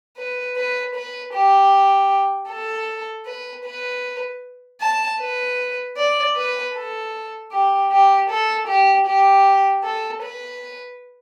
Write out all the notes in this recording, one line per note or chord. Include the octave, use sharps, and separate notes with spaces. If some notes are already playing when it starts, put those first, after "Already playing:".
B4
B4
B4
G4
A4
B4
B4
A5
B4
D5
B4
A4
G4
G4
A4
G4
G4
A4
B4